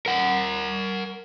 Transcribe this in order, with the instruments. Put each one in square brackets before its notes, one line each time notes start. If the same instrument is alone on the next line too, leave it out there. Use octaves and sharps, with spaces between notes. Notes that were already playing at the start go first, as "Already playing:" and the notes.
[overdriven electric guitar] A#4 F#5